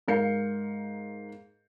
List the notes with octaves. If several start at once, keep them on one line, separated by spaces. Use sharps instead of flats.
G#2 A#4 F5 G6 C7 C#7